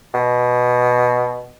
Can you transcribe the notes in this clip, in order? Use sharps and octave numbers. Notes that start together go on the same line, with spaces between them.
B2